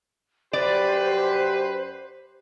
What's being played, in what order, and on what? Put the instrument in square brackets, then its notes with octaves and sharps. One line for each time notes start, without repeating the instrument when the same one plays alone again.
[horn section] F#2 B4 [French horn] G4 [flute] C5 [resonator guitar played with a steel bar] D5